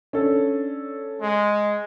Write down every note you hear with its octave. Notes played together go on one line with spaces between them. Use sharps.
C#4 D4 A4
G#3